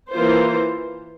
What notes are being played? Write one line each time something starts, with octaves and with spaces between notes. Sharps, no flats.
E3 A#3 F4 C5